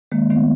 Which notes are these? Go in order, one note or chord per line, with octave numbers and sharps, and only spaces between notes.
D#3 G#3 A#3
D#3 A3 B3